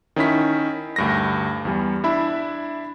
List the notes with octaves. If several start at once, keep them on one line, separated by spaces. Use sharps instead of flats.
D#3 C#4 E4 B6
D2 G2 A#6
E2 G3
D4 E4 E5 B5